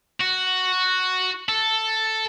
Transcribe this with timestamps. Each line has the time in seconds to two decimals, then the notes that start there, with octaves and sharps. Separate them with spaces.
0.20 F#4
1.49 A4